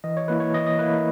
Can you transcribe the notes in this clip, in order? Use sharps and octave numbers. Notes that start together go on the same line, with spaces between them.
E3 D#5
C#5
A#3 E4 B4
C#5
E3 D#5
D#5
A#3 E4 B4
A#4